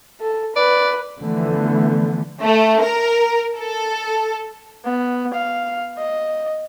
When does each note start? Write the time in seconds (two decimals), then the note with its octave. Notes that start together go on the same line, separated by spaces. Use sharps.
0.21 A4
0.56 B4 D5
1.20 D3 E3 F3 A3 B3
2.42 A3
2.82 A#4
3.57 A4
4.85 B3
5.34 F5
5.98 D#5